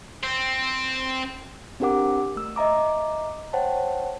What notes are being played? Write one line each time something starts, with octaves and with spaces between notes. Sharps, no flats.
C4
C4 D4 G4 A#4 F#5 D6
A3 E6
D#5 E5 A#5 D6
C5 C#5 F#5 G5 A5